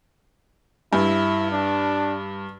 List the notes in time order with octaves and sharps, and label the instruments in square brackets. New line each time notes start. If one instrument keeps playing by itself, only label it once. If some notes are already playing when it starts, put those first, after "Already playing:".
[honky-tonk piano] G2 [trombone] E4
[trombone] D4